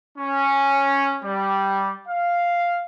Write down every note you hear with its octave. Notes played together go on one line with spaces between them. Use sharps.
C#4
G3
F5